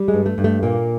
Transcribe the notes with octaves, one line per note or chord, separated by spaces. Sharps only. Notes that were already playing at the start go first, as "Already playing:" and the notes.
Already playing: G3
G#3
G2
A3
G2
A3
A#2 A#3